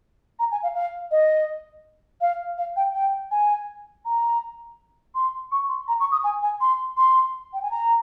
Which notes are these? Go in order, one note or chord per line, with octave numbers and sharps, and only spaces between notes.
A#5
G#5
F5
F5
D#5
F5
F5
G5
G5
G#5
A#5
C6
C#6
C6
A#5
C#6
D#6
G#5
G#5
C6
C6
G5
G#5
A#5